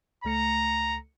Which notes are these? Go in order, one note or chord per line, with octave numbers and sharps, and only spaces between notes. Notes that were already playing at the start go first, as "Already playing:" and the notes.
C#2 A3 A#5 C#7